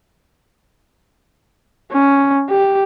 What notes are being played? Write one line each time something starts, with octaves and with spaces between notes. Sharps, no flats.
C#4
G4